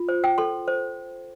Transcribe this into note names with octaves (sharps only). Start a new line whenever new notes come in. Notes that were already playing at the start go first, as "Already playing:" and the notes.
Already playing: F4
C5
G5
A4 C6
C5